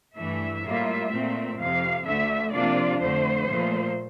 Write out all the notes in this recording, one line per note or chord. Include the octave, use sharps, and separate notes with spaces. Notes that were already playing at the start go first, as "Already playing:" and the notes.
G2 E3 A3 E5
A2 G3 A#3 F4
A#2 A3 C4
F2 C3 F3 F5
D2 D3 A3 E5
C3 F3 A#3 D4 F4 D5
F2 D3 A3 C5
A#2 F3 A3